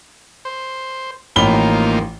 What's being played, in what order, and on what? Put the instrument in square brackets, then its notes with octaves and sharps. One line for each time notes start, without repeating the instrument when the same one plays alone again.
[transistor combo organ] C5
[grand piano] A1 B5 G7 [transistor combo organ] F3 A#3 D#4